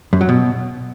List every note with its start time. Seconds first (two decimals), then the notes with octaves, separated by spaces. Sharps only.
0.13 F#2
0.21 F#3
0.29 B2